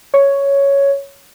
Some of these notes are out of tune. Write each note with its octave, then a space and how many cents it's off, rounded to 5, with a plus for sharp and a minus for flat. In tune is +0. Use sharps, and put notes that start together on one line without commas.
C#5 +5